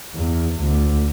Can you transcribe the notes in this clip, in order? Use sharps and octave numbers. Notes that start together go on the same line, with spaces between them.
E2
D2